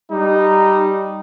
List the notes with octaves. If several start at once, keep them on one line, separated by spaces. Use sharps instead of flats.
G3 D#4